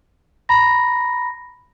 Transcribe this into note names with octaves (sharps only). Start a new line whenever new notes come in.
A#5 B5 A#6